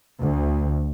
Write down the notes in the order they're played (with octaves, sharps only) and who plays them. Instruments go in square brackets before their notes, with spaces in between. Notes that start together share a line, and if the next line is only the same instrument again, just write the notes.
[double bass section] D2